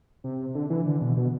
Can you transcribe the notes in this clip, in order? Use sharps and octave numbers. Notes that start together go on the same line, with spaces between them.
C3
D3
E3
D3
B2
B2